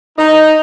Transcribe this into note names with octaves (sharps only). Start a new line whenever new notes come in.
D#4